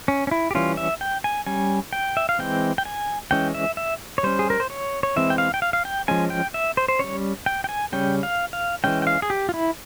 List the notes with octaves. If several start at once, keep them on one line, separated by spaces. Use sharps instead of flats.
C#4
C#4
E4
G4
E3 G3 C#4 F4
E5
G5
G#5
G3 C#4 G#5
G5
E5
F5
E3 G#3 C4 G5
G5
G#5
E3 G#3 C#4 G5
E5
E5
C#5
G3 C#4 C5
G#4
A#4
C5
C#5
C#5
E3 G#3 C4 E5
G5
F5
G5
F5
F5
G5
F3 G#3 C#4 G#5
G5
E5
C5
C5
G3 C#4 C#5
G5
G5
G#5
C#3 G3 C#4 G5
F5
F5
E3 G#3 C#4 G5
G5
F5
G#4
G4
F4
E4